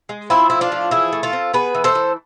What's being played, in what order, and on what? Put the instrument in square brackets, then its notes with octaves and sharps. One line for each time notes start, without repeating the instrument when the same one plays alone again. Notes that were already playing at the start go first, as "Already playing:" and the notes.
[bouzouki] G#3
F3 C4 E4
A2 E4
D4 F4
F3
E3 E4 G#4
A3
F4 A4
C4
B3 G#4 B4
E3
A4 C5
E3